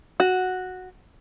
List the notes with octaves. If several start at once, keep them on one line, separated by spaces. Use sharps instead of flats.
F#4